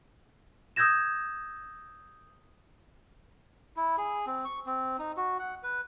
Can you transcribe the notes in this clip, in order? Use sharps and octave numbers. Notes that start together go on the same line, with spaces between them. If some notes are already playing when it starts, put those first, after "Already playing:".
D#6 E6 G6 G#6 A#6 E7
E4
G#4
C4
C#6
C4
D#4
F#4
F#5
B4